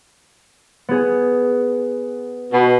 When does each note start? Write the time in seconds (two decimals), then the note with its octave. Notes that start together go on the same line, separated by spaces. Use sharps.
0.89 B3 G#4
2.52 B2